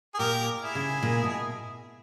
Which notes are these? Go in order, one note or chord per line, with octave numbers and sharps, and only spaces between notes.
G#4
A#2 G4 A#4
E4 G#4
C#3
A#2
B2